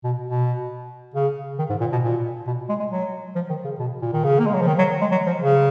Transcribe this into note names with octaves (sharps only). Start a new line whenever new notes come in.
B2
B2
C#3
D#3
G#2
A#2
B2
A#2
B2
G#3
G#3
F#3
F3
D#3
C#3
B2
A#2
D#3
C#3
A#3
G#3
F#3
F3
D#3
F#3
G#3
F#3
F3
C#3